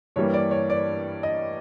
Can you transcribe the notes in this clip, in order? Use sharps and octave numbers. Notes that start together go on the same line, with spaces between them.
G2 E3 G3 A#3 C#5
D5
C#5
D5
D#5